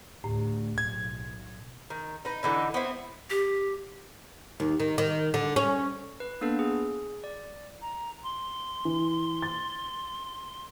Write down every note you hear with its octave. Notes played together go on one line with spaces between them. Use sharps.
D2 A2
B1 G#6
D#3
D#4 B4
D3 E3 D#4
B3 C4 E4
G4
D#2
D#3
D#3
D3
C#4
B4
A#3 B3 D4 A4 B4
G#4
D5
A#5
C6
E3
A6